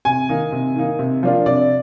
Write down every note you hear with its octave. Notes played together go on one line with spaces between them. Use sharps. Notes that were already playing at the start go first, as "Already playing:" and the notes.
C3 G#5
D#3 A#3 D#4
C3
D#3 A#3 D#4
C3
F3 A#3 D4 F4
C3 D5